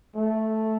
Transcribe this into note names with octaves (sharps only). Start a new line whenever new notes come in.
A3